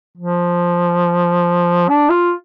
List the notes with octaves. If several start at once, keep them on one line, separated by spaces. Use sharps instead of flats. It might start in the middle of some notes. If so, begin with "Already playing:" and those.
F3
D4
F4